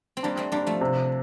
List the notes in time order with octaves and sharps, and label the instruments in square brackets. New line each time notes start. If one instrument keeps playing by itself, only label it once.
[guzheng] C4
[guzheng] G3 A#3 [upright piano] D4
[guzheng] A3 C4
[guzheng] G3 A#3 [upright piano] D4
[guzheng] F3 A3
[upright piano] C3